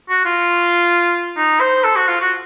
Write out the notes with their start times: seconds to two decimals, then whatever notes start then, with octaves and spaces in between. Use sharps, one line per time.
0.09 F#4
0.25 F4
1.37 D#4
1.60 C5
1.84 A4
1.96 F#4
2.08 F4
2.21 F#4